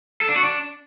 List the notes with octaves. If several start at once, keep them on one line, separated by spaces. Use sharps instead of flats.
A4
D4
F#4
D4